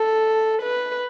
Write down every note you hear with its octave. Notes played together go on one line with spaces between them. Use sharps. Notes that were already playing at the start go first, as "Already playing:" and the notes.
Already playing: A4
B4